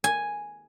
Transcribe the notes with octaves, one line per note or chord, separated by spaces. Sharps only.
G#5